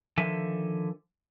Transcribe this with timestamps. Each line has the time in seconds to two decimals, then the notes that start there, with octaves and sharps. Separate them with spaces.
0.18 D3 D#3 F3 A4 E5 G#5